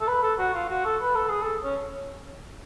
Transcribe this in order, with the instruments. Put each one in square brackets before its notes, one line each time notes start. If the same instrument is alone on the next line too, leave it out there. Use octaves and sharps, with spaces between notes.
[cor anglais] A4
B4
A4
F#4
F4
F#4
A4
B4
A4
G#4
A4
C#4